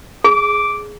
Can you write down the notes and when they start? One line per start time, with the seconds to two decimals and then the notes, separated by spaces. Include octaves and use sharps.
0.24 G#4 D6